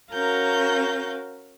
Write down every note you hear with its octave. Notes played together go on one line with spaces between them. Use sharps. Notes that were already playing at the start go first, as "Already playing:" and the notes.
C#4 F#4 A#4 F5 A#5 G6